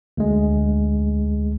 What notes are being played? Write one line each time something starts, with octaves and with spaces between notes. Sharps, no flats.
D2 G#3